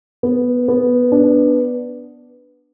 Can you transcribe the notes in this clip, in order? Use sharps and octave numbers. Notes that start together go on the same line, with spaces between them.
B3
B3
D4